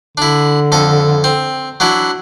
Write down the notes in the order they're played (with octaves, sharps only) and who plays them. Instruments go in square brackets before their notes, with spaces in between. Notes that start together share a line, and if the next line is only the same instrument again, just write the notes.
[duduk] D3 [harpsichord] D4 E4
[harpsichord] F2 A4
C4
F#3 D4 E4